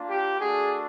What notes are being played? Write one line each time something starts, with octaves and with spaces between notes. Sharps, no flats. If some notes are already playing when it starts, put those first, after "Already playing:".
Already playing: A#3 D4 F4
G4
A3 D4 F#4 G#4